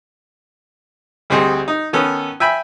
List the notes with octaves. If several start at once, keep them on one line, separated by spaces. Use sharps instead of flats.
D2 G3 C4 G#4 D#5
D#4
D#3 B3 C#4 A4
E5 G5 G#5 B5